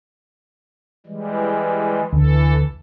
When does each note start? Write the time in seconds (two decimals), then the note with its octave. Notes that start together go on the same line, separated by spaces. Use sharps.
1.06 E3 G3 G#3
2.13 D2 E3 A4